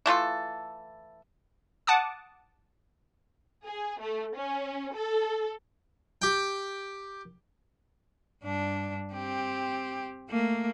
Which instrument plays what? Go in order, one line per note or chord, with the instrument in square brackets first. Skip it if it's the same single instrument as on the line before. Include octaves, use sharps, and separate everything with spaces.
[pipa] E3 A3 F4 A4
[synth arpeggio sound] F#5 A5 D6 D#6
[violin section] G#4
A3
C#4
A4
[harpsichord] G4 G5
[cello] G2 D4
C4 G4
A3 A#3